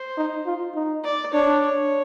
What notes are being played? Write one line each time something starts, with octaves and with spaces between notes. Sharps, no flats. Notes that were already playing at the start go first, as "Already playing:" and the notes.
Already playing: C5
D#4
F4
D#4
D5
D4 C#5
C#5